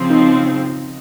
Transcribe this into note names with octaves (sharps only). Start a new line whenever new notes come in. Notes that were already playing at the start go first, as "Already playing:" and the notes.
Already playing: C#3 F3 C4
D#4